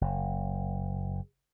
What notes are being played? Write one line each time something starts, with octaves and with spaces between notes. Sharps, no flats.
F#1